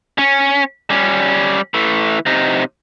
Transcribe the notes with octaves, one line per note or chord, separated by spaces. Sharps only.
C#4
G3 C#4
E3 A3
C3 D#4